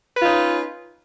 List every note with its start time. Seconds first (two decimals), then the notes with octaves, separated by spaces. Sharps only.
0.16 B4
0.19 F4
0.22 D#4
0.26 C#4